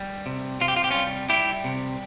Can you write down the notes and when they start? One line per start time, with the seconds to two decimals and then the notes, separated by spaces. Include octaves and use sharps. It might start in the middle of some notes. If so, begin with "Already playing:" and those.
Already playing: G3
0.26 C3
0.61 C3 F4
0.68 G4
0.76 F4
0.84 G4
0.90 G3 C#4 F4
1.29 G3 E4 G4
1.64 C3